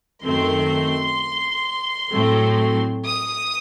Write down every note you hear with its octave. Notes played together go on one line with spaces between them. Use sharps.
F#2 D#3 A3 C4 C6
A2 F#3 A3 C4
D#6